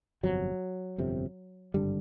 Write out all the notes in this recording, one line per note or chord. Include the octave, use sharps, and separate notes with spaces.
G1 F2 C3 F#3
G1 F2 C3
G#1 G2 D3 G3